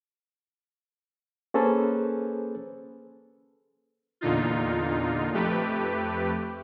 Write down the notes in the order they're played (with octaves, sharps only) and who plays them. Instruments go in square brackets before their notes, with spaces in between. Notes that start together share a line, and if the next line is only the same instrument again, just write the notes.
[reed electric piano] A#3 C#4 G#4 A4 B4 C5
[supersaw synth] E2 A#2 D3 D#4 F4
F2 A3 G4 B4